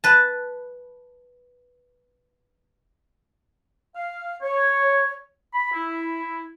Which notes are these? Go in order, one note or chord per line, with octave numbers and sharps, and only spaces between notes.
B4 A5
F5
C#5
B5
E4